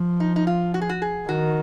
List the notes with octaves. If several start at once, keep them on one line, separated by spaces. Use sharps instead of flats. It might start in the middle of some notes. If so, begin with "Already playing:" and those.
Already playing: F3
D#4
D#4
F4
F#4
G#4
F#4
G#4
D#3 F#4